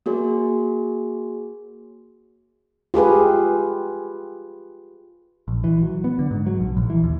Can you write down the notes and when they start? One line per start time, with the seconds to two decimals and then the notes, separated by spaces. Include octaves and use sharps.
0.06 A#3 F#4 G#4 C#5
2.94 F4 G4 G#4 B4
5.48 A#1
5.64 E3
5.82 F#3
6.04 B3
6.19 D3
6.31 G#2
6.46 F#3
6.60 B1
6.77 A#1
6.90 E3
7.04 D#2